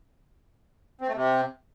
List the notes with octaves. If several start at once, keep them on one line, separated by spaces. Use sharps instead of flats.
C4
A3
C3